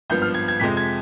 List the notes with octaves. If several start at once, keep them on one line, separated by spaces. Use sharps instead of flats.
G#1 G2 F3 B3 G6
F6
G#6
G#6
F2 C3 F3 G#3 B6
G#6